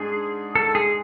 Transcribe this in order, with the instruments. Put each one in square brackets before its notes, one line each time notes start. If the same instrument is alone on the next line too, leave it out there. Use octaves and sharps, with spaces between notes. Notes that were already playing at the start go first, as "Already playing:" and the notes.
Already playing: [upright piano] G#2 D4 [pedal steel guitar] G#4
[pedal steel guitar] A4
G#4